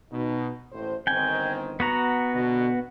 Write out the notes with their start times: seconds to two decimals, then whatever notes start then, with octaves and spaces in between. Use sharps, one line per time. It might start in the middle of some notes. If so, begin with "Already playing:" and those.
0.11 B2 D#4
0.72 A1 A2 C5
1.07 G1 D#3 C4 G5 G#5
1.80 B3 F#4 A#5
2.33 B2 D3